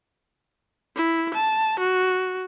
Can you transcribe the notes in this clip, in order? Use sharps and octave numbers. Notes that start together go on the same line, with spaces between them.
E4
A5
F#4